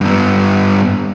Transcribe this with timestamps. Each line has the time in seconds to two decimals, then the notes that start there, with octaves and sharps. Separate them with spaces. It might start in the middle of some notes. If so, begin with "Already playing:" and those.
0.01 G2 B3